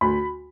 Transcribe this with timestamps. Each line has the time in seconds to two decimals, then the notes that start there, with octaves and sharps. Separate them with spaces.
0.01 D2 B5